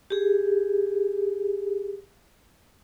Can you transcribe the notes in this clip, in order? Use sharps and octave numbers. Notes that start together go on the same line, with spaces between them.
G4 G#4